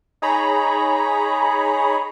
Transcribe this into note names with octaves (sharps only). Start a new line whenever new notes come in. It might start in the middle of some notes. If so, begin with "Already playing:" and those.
D#4 G#4 C#5 A#5 B5